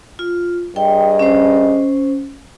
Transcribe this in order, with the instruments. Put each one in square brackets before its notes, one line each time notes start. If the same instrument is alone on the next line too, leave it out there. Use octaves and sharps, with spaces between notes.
[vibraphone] F4
[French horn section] G2 G#4 D#5 [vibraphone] G5
[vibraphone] C#4 C5